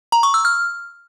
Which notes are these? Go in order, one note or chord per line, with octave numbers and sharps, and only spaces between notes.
A#5
C#6
E6
F6